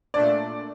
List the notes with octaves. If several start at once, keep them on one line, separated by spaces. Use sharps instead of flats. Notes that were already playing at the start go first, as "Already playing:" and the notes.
A#2 A3 D4 D5